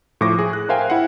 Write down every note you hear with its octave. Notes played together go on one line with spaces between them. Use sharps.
A2 F3 C#6 D6 A#6
G#4
F#6
A#4 C5 E5 F5 G5 G#5
E4 F#5